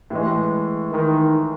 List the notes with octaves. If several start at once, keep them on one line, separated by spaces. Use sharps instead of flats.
A2 E3 G#3
D#3